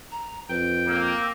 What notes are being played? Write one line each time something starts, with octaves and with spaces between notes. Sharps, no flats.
A#5
F2 B4 G5
A#3 E6